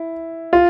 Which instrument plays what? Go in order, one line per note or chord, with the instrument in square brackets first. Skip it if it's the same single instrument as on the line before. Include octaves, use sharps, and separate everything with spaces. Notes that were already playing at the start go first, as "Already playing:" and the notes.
Already playing: [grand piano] E4
F4